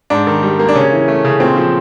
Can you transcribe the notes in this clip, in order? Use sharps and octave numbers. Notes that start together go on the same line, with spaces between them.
G#2 D4
D#3
G3
A#3
D4
C#3 C#4
E3
A3
C#3
A#2 C4
F3